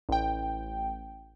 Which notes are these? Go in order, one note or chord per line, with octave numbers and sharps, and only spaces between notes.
A1 G5